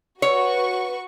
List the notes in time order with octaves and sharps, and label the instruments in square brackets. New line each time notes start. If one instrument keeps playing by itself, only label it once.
[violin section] F#4 B4 C#6 [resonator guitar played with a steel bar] C#5